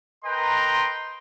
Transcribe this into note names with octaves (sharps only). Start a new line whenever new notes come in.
A#4 B4 D#5 G5 A#5 C6